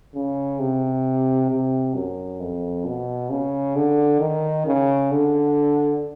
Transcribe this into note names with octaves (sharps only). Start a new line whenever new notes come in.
C#3
C3
C3
F#2
F2
B2
C#3
D3
D#3
C#3
D3